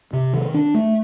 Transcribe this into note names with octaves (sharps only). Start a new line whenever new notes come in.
C3
D#3
D4
A3